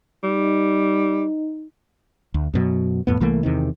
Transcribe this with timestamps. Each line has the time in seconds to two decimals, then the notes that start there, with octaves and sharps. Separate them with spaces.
0.23 G3 D#4
2.34 D2
2.54 F#2 B2 F#3
3.07 F2 A2 B3
3.20 C2 E3 A3 A#3
3.43 E2 C3 D#3